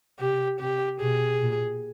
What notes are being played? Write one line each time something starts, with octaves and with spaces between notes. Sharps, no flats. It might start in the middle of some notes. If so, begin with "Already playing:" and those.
C3 G4
C3 G4
B2 G#4
A#2